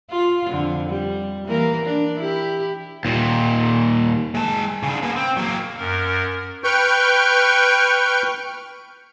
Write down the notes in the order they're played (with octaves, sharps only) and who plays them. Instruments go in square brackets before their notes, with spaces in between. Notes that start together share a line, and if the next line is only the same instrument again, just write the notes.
[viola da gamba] F4
F2 D3
G3
E3 A#3 A#4
D4
E4 G4
[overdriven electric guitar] D#2 A#2
G#3 A5
C#3 D4
A#3 B4
C4
F#3 A#3
[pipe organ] F#2 A#4
[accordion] B4 G5 C#6 F6 G6